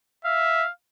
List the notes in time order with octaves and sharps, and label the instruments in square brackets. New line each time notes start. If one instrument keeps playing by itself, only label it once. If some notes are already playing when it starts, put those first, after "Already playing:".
[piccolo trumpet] E5 [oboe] F5